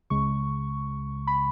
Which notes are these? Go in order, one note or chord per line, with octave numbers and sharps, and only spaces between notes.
C#2 C#3 G#3 C#6
B5